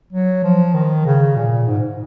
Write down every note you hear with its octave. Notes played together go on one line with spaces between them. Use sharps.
F#3
F3
D#3
C#3
A#2
A#2
G#2